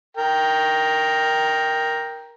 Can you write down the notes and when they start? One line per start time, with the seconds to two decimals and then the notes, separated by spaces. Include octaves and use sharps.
0.17 A#4 G5